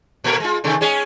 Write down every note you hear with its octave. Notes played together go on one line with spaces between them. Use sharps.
A#2 A3 A#4
G#3 F4
C3 D#3 A3
G#3 C#4 G#4